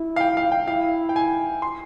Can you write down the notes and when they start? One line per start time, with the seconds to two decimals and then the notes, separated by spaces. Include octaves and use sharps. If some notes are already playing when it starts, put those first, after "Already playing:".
Already playing: E4
0.16 F5
0.21 G5
0.37 F5
0.52 G5
0.68 E4 F5
1.09 G5
1.16 G#5
1.62 C6